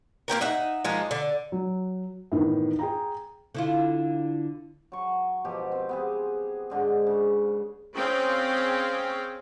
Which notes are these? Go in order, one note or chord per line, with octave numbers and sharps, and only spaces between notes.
A#3 C4 G4 A#4
D#4 E5 F#5
F3 G#3 A#3 D#4
D3
F#3
A2 D#3 E3 B3
G#4 G5 A#5
D3 E4 F4
F#3 C#6
B2 F3 G4
C4
B3 C4 G#4
G#2 D3 G#4
C#3
C4 C#4 G#4 F5 G5